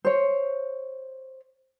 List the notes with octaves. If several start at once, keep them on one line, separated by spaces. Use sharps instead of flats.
C5 C#5